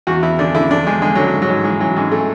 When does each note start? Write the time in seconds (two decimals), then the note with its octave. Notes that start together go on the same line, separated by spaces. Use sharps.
0.07 E2 F#4
0.23 E2 E4
0.39 D3 D4
0.55 D3 E4
0.71 E2 D4
0.87 E2 G#3
1.01 D3 G#3
1.15 D3 F#3
1.33 G#2
1.42 F#3
1.49 G#2
1.64 E3 G#3
1.80 E3 F#3
1.96 G#2 G#3
2.12 A3